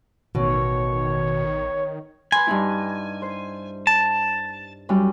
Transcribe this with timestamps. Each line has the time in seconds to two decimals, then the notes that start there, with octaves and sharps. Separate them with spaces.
0.35 A1 B2 D#3 C#5
2.32 B4 G#5 B5 C6
2.47 G2 D#4 E4
3.22 C5
3.87 A5
4.89 F#2 G3 E4